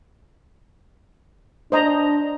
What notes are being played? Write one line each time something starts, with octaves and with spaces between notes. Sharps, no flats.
D4 C5 D#5 A#5